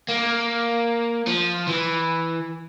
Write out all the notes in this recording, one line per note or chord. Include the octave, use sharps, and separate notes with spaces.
A#3
F3
E3